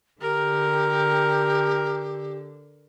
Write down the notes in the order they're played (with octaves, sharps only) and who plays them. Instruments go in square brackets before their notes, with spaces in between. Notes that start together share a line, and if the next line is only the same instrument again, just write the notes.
[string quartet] D3 [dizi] G4 [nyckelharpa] A#4